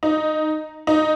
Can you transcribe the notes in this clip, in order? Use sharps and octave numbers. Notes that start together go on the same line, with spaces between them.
D#4
D#4